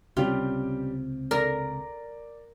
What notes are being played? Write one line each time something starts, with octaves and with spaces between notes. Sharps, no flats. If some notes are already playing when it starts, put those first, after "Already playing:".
C#2 C3 G3 C4 C#4 F4 G4
A#4 D5 A#6